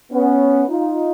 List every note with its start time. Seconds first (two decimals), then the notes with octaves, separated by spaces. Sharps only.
0.12 B3 C#4
0.68 D#4 F4